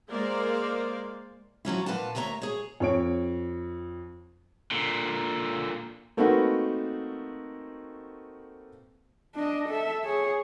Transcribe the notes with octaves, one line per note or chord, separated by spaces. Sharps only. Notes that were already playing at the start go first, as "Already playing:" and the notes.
G#3 A#3 A#4 C5 D5 F5
F3 F#3 C#4 E4
A#2 G3 B4 F5 F#5 A5
D2 A#3 C#5 E5 A#5
G#4 C#5
F2 C#5 D7
A#2 D3
A3 A#3 C4 D#4 F#4 B4
D4 D#5
A4 E5
G#4 C#5